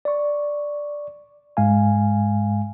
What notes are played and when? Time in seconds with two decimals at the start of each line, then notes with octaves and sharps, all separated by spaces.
0.05 D5 C#6
1.57 G#2 G#3 F5 G#5